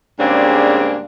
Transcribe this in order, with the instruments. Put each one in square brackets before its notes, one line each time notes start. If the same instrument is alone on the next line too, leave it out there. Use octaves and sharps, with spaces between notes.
[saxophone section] G#2 C#3 G3 A#3 C4 D4